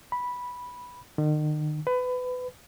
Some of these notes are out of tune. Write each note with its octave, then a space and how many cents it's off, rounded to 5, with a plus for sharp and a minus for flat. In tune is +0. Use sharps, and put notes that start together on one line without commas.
B5 -5
D#3 -40
B4 +25